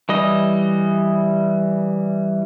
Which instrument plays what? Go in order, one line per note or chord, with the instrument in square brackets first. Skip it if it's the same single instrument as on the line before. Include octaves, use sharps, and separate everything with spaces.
[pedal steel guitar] E3 G3 D#5